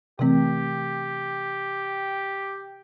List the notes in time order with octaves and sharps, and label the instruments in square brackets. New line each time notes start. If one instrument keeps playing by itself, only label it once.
[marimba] C3 E3 A3 C4 [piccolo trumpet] G4